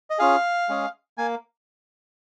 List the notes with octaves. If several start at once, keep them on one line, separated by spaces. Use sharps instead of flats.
D#5
C#4 F4 G#4 F5
G#3 C#4 G#4
A#3 G#5